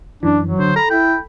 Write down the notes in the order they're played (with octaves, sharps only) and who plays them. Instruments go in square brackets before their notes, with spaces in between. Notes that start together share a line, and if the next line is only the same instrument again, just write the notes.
[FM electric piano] F#2 E3 [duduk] D4
[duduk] F#3
[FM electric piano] D3 [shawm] C5
[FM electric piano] A4 B5 [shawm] A#5
[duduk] E4 [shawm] G5